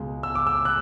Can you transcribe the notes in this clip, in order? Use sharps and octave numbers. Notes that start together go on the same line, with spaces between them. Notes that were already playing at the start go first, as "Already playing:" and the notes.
Already playing: C#2 B2 G#3
E6
D6
E6
F#6